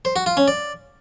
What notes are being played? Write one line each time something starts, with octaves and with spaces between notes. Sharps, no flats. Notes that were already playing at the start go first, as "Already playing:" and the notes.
C5
F#4
F4
C#4
D5